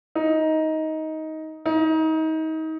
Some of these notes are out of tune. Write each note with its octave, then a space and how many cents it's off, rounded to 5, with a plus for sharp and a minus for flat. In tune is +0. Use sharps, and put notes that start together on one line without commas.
D#4 +15
D#4 +30